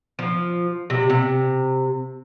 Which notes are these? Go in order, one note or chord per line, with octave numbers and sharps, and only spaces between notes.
F3
C3
C3